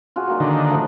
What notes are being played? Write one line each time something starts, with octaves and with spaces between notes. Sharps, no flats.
F4 F#4 G#4
F#3 A#3 D#4
D3 D#3
F3 A3 D#5